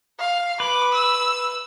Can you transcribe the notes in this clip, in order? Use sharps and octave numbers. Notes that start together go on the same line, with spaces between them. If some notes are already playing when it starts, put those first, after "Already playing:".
F5
B4 D6
E6